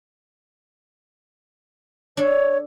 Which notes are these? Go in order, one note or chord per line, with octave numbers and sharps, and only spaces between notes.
D4 A4 C#5